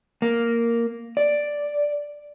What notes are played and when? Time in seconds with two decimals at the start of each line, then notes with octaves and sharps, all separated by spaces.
0.22 A#3
1.17 D5